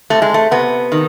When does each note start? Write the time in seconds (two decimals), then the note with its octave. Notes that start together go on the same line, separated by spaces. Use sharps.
0.10 C3 A3
0.22 G#3
0.34 A3
0.51 C3 B3
0.92 D#3